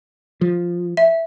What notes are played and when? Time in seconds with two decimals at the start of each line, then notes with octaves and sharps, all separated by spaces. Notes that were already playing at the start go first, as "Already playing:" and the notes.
0.41 F3
0.97 E5